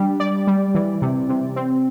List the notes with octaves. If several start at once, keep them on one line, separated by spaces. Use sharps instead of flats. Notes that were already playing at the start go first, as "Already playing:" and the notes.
Already playing: G3 D4 G4
D5
G3
E3
C3
C3
C4